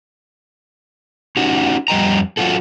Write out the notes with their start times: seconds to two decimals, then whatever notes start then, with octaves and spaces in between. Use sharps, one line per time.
1.37 C#4 D#4 F#4 G4
1.88 F2 G3 D#5 G5 A#5
2.37 F#3 F4 F#4 A4